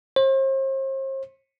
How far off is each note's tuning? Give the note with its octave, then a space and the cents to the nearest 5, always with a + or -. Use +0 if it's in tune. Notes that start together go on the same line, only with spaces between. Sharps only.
C5 +40